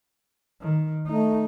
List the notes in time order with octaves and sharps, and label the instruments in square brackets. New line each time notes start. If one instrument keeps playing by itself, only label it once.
[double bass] D#3
[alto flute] A3 [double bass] D#4